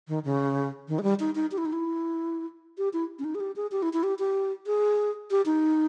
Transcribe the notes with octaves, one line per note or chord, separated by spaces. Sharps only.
D#3
C#3
D#3
G#3
G3
D#4
D#4
G4
E4
D#4
E4
G4
E4
C#4
D#4
G#4
G4
G#4
G4
E4
E4
G4
G4
G#4
G4
D#4